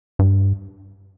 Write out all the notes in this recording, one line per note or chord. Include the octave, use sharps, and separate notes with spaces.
G2